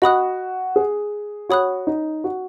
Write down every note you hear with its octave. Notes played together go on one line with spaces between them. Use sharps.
F#4 D#5 B5 D#6 F#6
G#4
F#4 C#5 B5 D#6 F#6
D#4
F#4